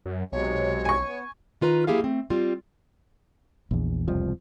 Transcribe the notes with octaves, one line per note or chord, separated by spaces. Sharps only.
F#2
B1 C3 F#3 G#3 C#5
G#5 C#6
B3
D#3 F4 B4 A#5
F3 A#3 E4 G4 G#4 F5
A3 C4
G3 C4 F4
A#1 E2
E1 C2 F2 F3